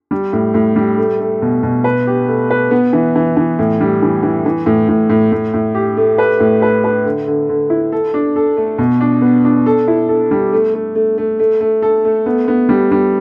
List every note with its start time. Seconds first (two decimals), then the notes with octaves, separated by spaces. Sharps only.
0.11 G3
0.33 A2
0.54 A2
0.76 G3
0.98 A3
1.20 A3
1.42 B2
1.63 B2
1.84 B4
2.07 G4
2.28 A3
2.50 B4
2.71 B3
2.93 E3
3.16 E3
3.37 E3
3.59 A2
3.81 G3
4.02 E3
4.23 E3
4.46 E3
4.66 A2
4.89 A2
5.10 A2
5.32 A2
5.54 A2
5.75 G4
5.97 A3
6.18 B4
6.40 A2
6.62 B4
6.84 B4
7.05 D3
7.27 D3
7.49 D3
7.70 E4
7.92 A4
8.14 D4
8.36 A4
8.57 A3
8.78 B2
9.00 D4
9.22 B3
9.45 D4
9.66 A4
9.88 E4
10.09 A4
10.31 G3
10.53 A3
10.74 A3
10.95 A3
11.18 A3
11.39 A3
11.61 A3
11.82 A4
12.05 A3
12.26 B3
12.48 B3
12.69 G3
12.91 G3